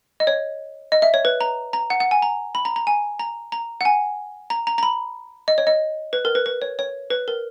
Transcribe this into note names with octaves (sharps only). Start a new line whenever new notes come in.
D#5
C#5
D#5
E5
C#5
B4
A#5
A#5
F#5
F#5
G#5
A#5
B5
A#5
A#5
G#5
A#5
A#5
F#5
G#5
A#5
A#5
A#5
B5
D#5
C#5
D#5
B4
A#4
B4
B4
C#5
C#5
B4
A#4